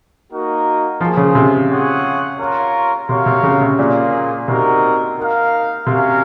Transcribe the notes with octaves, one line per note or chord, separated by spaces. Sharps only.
A#3 D#4 F#4 A#4
F3 A#3 F4 G#4 C5
C#3
C3
F4 G#4 C#5 F#5
F4 A#4 C#5
C3 F#4 A#4 C#5 F5
C3
C#3
C3
A#2 A#3 C#4 F4 G#4
C3 C4 D#4 F#4 A#4
D#4 A#4 F5
C3 C#4 F#4 A#4 F5